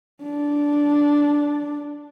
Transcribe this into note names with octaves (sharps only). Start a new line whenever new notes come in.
D4